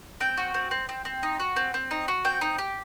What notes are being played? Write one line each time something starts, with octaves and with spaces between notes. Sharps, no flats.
C4 G5
F#4
C4
C4
C4
C4
D#4
F#4
C4
C4
D#4
F#4
C4 G5
D#4
G4